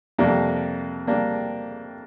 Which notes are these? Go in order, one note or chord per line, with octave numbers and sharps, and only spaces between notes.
F2 C3 G3 A#3 D4
G3 A#3 D4